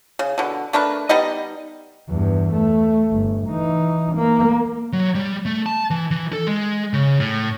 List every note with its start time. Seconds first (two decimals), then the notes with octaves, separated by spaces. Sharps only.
0.19 C#3
0.38 B2 D3
0.73 A3 D4 A#4 B4
1.09 G3 B3 D#4 D#5
2.09 E2 G2
2.51 A3
3.11 G1
3.48 E3 D#4
4.15 A#3
4.93 F#3
5.15 G3
5.45 A3
5.66 A5
5.90 E3
6.11 E3
6.33 A4
6.47 G#3
6.93 C#3
7.20 A2